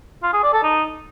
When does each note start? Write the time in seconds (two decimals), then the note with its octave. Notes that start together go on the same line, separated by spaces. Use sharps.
0.23 F4
0.33 G#4
0.43 D5
0.53 A4
0.63 D#4